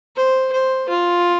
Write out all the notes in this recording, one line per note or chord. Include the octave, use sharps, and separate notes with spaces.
C5
C5
F4